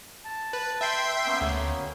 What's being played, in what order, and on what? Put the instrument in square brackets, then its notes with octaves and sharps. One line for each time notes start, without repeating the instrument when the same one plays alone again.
[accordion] A5
[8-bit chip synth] B4
E5 G5 C6
[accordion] A#3 B3 C#4
[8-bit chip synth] D2